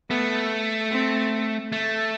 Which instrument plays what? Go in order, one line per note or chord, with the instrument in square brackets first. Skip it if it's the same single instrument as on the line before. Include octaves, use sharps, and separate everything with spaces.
[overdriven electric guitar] A3 [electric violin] B3
[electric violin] C4
[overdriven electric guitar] A3